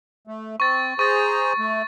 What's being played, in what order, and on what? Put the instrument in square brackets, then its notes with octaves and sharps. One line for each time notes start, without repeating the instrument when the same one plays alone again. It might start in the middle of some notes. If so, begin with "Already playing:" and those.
[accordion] A3
[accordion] C4 [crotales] C#6 A6
[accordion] G#4 C5 A#5 [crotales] C#6 A6
[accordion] A3